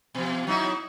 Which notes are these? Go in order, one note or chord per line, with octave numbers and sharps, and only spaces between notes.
B2 F3
F#3 D#4 E4